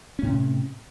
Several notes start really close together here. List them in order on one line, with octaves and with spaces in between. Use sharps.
C#4 A2 C3